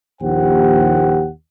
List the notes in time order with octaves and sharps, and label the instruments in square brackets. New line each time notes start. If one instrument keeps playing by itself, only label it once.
[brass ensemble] A#1 D#2 G4 C5 F#5 G5